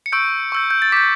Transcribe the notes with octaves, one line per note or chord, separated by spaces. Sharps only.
C#7
C#6 E6 G6 D7
C#6 E6 G6
G6
A6
D6 G6 B6